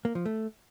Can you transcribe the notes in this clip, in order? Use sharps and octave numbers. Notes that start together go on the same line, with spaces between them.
A#3
F3
A3